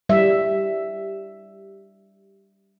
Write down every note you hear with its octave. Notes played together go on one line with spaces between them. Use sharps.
G3 E5